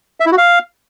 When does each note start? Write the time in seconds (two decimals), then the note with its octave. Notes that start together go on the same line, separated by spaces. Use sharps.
0.20 E5
0.26 E4
0.32 F#4
0.38 F5